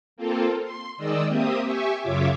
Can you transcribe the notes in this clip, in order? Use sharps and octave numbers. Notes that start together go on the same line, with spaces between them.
A#3 C4 F4 A4
C6
D#3 G#3 D5 D#5 E6
A#3 C4 G4 E5 D#6
G4 E5 G#5 C#6
F#2 C#3 F4 C#5 E5 D6